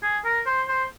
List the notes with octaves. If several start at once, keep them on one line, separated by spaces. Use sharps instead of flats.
G#4
A#4
C5
C5